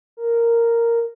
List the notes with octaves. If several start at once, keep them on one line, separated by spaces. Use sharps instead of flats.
A#4